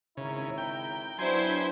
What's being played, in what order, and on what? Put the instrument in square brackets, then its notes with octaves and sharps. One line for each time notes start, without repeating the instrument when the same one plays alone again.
[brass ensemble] G#1 E4 A#5 [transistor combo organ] C#3
[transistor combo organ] G5
[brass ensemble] F#3 [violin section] B3 D4 E4 [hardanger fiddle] C5 [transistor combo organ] G5 G#5 C6